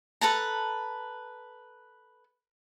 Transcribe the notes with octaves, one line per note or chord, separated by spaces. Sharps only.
A4 B4 A5 A#5